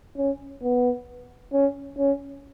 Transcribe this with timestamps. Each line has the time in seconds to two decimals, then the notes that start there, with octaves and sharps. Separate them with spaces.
0.17 C#4
0.62 B3
1.53 C#4
1.98 C#4